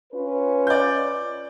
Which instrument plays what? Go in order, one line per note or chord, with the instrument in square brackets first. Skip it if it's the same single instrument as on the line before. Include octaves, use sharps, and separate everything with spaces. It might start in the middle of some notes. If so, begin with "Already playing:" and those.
[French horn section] C#4 F4 B4
[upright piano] D5 G6